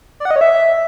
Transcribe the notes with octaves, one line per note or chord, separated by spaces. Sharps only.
D5
F#5
D#5
C#5
E5